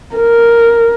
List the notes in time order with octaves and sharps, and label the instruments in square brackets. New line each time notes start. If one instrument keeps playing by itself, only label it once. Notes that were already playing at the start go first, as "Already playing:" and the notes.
[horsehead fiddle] A#4